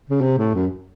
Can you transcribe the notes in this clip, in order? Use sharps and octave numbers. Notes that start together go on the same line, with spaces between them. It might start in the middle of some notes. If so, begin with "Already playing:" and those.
C#3
C3
A2
F#2